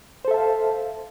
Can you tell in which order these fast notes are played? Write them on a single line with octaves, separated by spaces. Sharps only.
C5 A4 E5 A5 F5